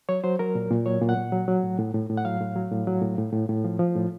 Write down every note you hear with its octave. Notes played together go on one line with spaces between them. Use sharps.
F#3 C#5
F#3 C5
F#3 A#4
A#2
A#2
F#3 C#5
A#2
F#5
A#2
F#3
F#3
A2
A2
A2
A2
F#5
F#3 F5
A2
F#3
A2
F#3
A2
A2
A2
A2
F3
F3
A2